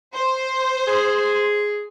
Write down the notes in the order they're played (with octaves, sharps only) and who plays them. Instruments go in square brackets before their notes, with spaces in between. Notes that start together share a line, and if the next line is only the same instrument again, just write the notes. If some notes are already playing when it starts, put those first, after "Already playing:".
[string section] C5
[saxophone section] G#4